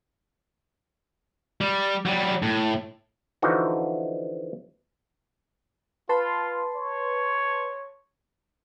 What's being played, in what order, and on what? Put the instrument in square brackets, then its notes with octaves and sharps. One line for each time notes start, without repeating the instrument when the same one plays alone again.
[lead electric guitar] G3
F#3 G3
A2
[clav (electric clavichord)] D3 E3 F3 D#4 F#4
[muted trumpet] F4 [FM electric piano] B4 A5 C6
[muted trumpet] C#5